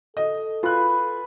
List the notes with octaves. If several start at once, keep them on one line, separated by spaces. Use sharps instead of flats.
A4 D#5
F4 B4 G#5 F#6